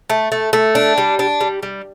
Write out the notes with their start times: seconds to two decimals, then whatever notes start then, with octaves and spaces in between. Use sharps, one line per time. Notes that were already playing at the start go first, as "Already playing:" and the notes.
0.10 A3
0.32 A3
0.53 A3
0.75 D4
0.98 G3
1.19 D4
1.41 G3
1.63 G3